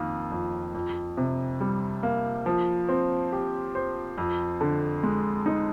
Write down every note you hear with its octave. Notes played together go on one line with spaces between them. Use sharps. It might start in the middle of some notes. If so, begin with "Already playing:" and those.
Already playing: F2 D#3 A#3
F2
F2
C3
G3
A#3
F3
C4
G4
C5
F2
D3
G#3
D#4